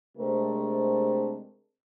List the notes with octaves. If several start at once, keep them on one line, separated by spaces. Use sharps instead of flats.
C3 G#3 A3 C4 D4 A#4